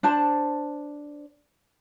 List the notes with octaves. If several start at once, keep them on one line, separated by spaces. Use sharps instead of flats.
D4 C5 A5